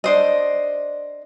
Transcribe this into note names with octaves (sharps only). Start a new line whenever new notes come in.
D4 C5 D#5